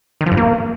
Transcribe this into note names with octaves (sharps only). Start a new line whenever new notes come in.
D#3
F3
G2
A#3